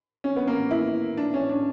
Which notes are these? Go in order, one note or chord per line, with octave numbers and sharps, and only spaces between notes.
C#4
B3
A#3
E4
D4
C#4
D4